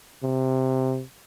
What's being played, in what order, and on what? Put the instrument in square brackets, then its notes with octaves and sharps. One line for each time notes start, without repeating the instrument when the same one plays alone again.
[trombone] C3